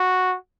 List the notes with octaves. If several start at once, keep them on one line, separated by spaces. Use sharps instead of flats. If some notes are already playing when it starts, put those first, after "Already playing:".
Already playing: F#4